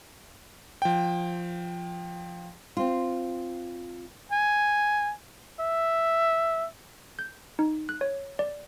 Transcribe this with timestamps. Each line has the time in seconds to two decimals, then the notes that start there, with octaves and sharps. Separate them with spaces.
0.82 F3 G5
2.77 C4 F4
4.32 G#5
5.61 E5
7.19 G6
7.59 D#4
7.89 F#6
8.01 C#5
8.39 D5